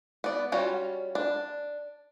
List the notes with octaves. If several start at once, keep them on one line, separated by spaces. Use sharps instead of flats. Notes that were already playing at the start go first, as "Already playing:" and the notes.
B3 D5
G3 C#4 F4 F#4
D4